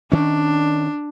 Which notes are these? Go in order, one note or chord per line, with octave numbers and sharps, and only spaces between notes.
D#3 C#4 D4